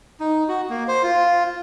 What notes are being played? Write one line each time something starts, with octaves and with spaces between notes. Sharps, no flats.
D#4
F#4
A#3
C5
F4